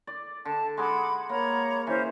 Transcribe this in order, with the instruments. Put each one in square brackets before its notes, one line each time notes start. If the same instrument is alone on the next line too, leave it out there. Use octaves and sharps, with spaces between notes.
[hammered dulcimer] D5
[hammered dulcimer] D3 [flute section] A5
[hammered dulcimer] G#3 D#4 G#4 [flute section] F#5 B5 D6
[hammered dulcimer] A#3 [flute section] C#5 A#5 B5
[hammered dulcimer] E3 [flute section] C#4 C5